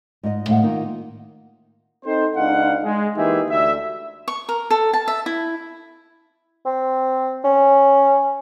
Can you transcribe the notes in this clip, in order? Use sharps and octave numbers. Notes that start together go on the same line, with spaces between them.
G#2 D#5
A2 G#3 F5 F#5
D#3 A#3 D#4 F4
C4 D#4 A4 C5
C#2 D4 D#4 F5 F#5
G#3
E3 A#3 D#4 G4 G#4 E5
D2 E5
C#6
A#4
A4
A5
E5
E4
C4
C#4